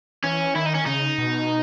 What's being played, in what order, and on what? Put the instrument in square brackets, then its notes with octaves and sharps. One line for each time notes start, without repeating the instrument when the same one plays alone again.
[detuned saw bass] E3 [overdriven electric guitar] C#4
[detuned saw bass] D#3 [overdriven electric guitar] E4
[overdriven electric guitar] D#4
C#4
[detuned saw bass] C#3 [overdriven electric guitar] D#4
[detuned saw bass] B2